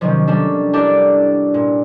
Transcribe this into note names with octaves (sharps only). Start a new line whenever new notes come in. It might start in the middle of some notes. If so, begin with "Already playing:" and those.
C3 D#3 F3 F#3 C4 C#4
G3 A#3 C#4 D4 A4
D4 E4 G4 A4 A#4 D5
A#2